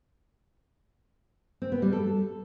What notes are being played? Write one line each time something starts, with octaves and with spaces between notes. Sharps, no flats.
C4
B3
G3
A4